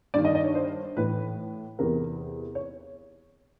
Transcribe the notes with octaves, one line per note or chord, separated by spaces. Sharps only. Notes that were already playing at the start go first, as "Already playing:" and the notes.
G2 D#3 D5
D#5
D#5
C#5
C5
A2 E3 B4
E2 C3 E3 A#4
C#5